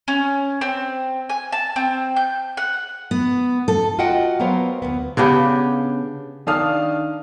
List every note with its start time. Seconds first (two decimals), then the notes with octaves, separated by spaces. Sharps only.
0.08 C#4
0.61 C4
1.30 G#5
1.52 A5
1.76 C4
2.16 G6
2.57 F#5
3.11 B3
3.68 A4
3.99 F4 F#4 D#5 F#5 G5
4.40 F#3 A#3 B3 C5 F5
4.82 D2 A#3 B3
5.17 C#3 B3 D4 G4
6.47 D#3 D4 F5 A5 D#6 F6